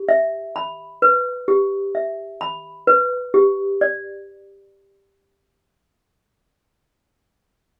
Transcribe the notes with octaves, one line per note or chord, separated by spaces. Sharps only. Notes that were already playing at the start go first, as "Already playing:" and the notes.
Already playing: G4
E5
B5
B4
G4
E5
B5
B4
G4
D5